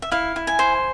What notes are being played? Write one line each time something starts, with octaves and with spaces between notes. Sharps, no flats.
E5
E4 F5
E4
G#5
C5